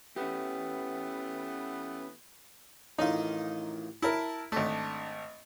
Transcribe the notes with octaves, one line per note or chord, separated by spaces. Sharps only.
E3 A3 B3 C#4 G4
A1 D#3 D#4 F4
E4 A#4 A5
G#1 A3 D4